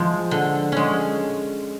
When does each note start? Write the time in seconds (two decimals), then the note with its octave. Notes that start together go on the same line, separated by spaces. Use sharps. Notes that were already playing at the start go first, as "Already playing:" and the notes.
Already playing: F3 G#3
0.31 D3
0.72 G#3 C#4